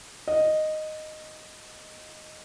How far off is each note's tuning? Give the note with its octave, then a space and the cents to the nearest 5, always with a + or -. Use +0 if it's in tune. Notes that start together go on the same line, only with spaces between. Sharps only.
D#5 -5